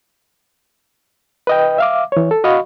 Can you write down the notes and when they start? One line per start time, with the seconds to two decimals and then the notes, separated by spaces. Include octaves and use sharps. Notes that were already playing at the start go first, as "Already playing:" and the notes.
1.47 B4 D#5 G5
1.78 E5 F5 D6
2.12 E3 C#5
2.31 A4
2.44 F#4 D#5 F5 B5 C#6